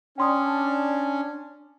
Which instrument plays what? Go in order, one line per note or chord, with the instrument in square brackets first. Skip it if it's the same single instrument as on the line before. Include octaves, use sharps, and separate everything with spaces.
[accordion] C#4 [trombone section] D4 [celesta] G5 C6 D#6